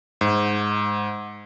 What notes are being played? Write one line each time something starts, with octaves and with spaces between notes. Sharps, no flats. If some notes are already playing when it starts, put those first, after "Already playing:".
G#2